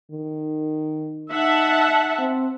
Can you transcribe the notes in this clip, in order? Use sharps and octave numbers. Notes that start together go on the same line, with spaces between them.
D#3
D#4 E5 F#5 A5
C4